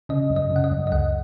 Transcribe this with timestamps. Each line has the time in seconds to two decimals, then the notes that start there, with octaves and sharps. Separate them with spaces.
0.09 C#3 D#5
0.30 F#2
0.36 D#5
0.50 C#3
0.56 F#5
0.64 D#5
0.71 F#2
0.87 D#5
0.92 C#2 F#5